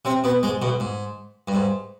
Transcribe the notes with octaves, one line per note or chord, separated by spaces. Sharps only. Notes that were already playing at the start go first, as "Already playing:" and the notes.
C3 C4
B2 B3
G#2 G#3
B1 B2
G#2
G2
G#2